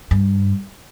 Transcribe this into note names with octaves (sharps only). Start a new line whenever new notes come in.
G2